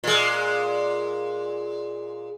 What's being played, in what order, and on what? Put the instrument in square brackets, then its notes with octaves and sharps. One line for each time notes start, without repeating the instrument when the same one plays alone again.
[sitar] A#2 G#3